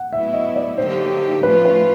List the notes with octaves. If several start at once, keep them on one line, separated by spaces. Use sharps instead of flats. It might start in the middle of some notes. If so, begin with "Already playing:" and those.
Already playing: F#5
A2 F#3 B3 E4 E5
D#5
D5
D3 F#3 A#3 D#4 G4 C5
A2 F3 A3 C#4 F4 B4
B4